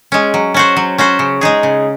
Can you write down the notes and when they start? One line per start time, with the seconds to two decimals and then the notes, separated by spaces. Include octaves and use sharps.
0.12 G#3 C#4
0.34 F#3
0.54 C#4 F#4 C5
0.77 F#3
0.98 C#4 F#4 C5
1.19 C#3
1.41 G#3 D#4 G#4
1.63 C#3